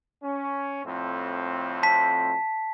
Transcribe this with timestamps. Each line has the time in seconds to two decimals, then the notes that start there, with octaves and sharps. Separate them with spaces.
0.21 C#4
0.84 F2 A2 C4
1.83 A5 B6